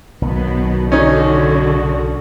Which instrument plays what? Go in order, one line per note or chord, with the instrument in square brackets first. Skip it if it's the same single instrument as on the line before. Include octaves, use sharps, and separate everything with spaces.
[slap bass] B1 D#3 [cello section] B2 F#3 B3
[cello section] D3 F#4 [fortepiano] C#4 D#4